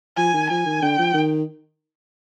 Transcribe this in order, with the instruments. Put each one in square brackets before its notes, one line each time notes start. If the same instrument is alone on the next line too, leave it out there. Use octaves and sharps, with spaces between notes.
[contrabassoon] F3 [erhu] G#5
[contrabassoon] D#3
[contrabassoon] F3 [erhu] G#5
[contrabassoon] D#3
[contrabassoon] D3 [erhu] G5
[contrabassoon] F3
D#3